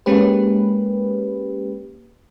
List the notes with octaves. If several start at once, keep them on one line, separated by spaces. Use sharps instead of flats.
G#3 A#3 C#4 G4 B4